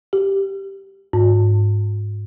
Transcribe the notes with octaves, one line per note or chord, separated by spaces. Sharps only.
G4
G#2